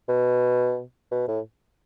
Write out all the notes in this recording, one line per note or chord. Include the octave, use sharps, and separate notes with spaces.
B2
B2
A2